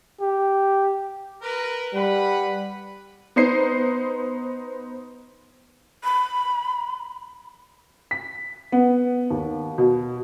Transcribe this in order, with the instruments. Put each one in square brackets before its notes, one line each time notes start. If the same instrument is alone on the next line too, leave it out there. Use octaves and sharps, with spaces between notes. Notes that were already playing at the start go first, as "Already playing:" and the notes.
[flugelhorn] G4
[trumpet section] A#4 B4
[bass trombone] G3 [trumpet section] B4 F#5 B5
[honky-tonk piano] B3 D#4 C5 C7
[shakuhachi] B5
[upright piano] B6
B3
D#2
B2